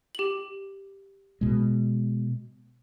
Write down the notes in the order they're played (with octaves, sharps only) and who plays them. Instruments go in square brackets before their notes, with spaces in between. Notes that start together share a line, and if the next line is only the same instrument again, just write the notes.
[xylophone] G4 F#7
[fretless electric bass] B2 G#3